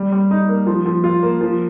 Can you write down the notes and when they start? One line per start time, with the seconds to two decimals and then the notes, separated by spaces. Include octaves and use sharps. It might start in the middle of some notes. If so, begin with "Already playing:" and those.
Already playing: G3
0.12 G3
0.31 D#4
0.49 A#3
0.67 F3
0.86 F3
1.04 F4
1.23 A#3
1.41 F3